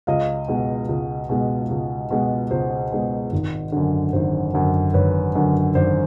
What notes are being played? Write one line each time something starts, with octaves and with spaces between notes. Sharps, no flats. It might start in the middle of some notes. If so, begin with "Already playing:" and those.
C#2 D#5 F5
B2 G#3
C#2
B2 G#3
C#2
B2 G#3
C#2 C5
B2 G#3
G#1
F#2 D3
G#1 C5
F#2 D3
G#1 B4 C#5
F#2 D3
G#1 C5 D5